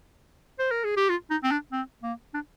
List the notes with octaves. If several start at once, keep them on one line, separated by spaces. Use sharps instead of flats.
C5
A#4
G#4
G4
F4
D#4
C4
D4
C4
A#3
D4